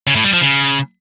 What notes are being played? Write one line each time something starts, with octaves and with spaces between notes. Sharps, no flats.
C#3
A2
G3
F3
C#3